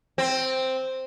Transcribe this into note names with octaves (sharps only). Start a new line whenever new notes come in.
C4